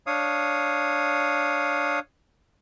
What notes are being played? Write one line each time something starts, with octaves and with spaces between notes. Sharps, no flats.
D4 C#5 F5 D#6